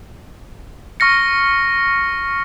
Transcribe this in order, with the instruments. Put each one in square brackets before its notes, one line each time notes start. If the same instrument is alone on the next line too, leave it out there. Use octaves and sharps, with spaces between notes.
[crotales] C#6 F6 A#6 C#7